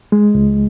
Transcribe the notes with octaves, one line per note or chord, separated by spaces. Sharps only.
G#3
C#2